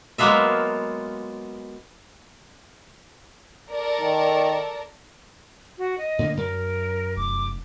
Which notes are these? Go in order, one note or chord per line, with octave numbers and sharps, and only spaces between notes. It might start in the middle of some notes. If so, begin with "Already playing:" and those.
F#3 G#3 A#3 B3 F4 E5
A4 A#4 D5
D#3
F#4
D#5
A2 D3 A#3
F#2 A#4
F1 D6